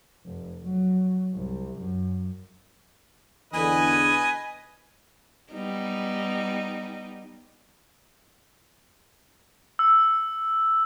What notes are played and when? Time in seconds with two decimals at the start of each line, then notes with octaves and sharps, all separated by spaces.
0.25 F1
0.63 F#3
1.34 C2
1.78 F#2
3.53 E2 D3 B4 D#5 G#5
5.51 G3 B3 D#4
9.79 E6